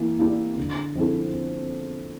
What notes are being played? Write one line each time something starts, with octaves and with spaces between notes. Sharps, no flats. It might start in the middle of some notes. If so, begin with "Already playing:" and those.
Already playing: E3 A#3
A#3 E4 G4 D5
D3
F3 C4 E4 A4